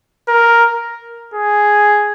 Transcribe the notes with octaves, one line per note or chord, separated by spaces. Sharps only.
A#4
G#4